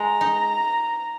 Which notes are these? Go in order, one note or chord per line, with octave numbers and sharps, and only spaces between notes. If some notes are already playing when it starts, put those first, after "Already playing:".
Already playing: G#3 A#5
D#4